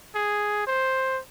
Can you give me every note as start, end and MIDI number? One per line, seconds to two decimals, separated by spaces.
0.15 0.63 68
0.67 1.20 72